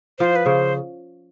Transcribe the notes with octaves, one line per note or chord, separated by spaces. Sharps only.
F3 C5
B4
C#3 C5